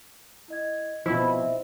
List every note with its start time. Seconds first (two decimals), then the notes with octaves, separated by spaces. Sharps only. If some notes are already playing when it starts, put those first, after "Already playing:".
0.48 E4 D#5 G#6
1.06 B2 F3 C4 E4 D#5